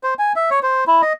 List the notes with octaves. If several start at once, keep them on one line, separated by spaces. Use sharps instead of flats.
C5
G#5
E5
C#5
C5
E4
D#5